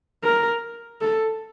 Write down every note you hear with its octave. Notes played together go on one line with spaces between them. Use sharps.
A#4
A4